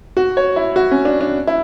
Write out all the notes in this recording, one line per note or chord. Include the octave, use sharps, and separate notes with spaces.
F#4
C#5
E4
F#4
C#4
D4
D4
E4